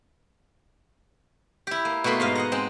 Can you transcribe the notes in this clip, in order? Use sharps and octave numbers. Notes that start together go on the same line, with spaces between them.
E4 G4
A#3
B2 A3 A#3 B5 C6
G#2 D#5 F5
D#5 F#5 A#5
G#3 C4